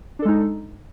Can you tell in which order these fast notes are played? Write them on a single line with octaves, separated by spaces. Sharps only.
D4 A4 G#3 D#4